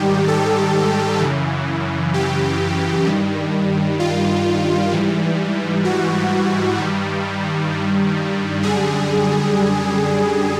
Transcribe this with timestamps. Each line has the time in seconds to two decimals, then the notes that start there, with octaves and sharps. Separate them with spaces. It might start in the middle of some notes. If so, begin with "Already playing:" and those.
Already playing: G#2 D#3 G3 G4
0.28 A4
1.20 F#2 C#3 E3
2.14 G4
3.06 G2 D#3 G3
4.00 F4
4.91 G#2 E3 G3
5.85 F#4
6.78 G2 D#3 G3
8.63 F#2 D3 G3 G#4